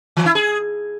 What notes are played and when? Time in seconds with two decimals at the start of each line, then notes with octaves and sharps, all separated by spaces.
0.17 E3
0.26 E4
0.35 G#4